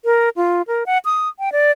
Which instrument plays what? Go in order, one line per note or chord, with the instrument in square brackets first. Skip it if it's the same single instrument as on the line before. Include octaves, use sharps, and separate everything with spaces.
[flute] A#4
F4
A#4
F#5
D#6
G5
D5